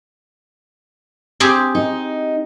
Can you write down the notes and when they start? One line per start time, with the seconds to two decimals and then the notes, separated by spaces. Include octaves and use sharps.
1.40 C4 G4 G#4
1.75 D#4